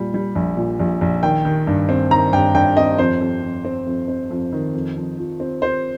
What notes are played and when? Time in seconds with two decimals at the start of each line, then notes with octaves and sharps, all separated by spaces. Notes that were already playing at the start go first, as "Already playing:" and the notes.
Already playing: A#2 G3
0.14 G3
0.35 A#1
0.57 A#2
0.79 A#1
1.01 A#1
1.23 D#3 G5
1.45 D#3
1.67 G2
1.89 C4
2.11 D#3 A#5
2.33 G2 G5
2.55 G2 G5
2.77 C4 D#5
2.98 F2 C5
3.21 F2
3.42 F2
3.65 C4
3.86 F2
4.08 C4
4.30 F2
4.53 D#3
4.74 F2
4.96 F2
5.18 F3
5.40 C4
5.62 C4 C5